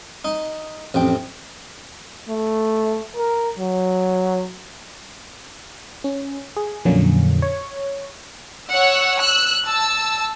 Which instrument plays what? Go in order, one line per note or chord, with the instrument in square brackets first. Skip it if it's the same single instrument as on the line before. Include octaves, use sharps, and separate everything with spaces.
[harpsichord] D#4
A1 F2 G5
[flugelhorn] A3
A#4
F#3
[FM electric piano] C#4
G#4
F2 A#2 D3 F#3 A#3 C#4
C#5
[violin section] C#5 F#5 E6
E6 F#6
A5 E6